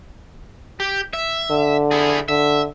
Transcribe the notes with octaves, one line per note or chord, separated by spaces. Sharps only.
G4
E5
D3
E4 G#4
D3 E5